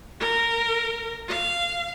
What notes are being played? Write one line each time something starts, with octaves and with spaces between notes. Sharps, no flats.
A#4
F5